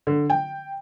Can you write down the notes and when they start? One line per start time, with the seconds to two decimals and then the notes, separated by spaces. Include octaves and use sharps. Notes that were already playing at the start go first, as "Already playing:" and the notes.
0.07 D3
0.30 G5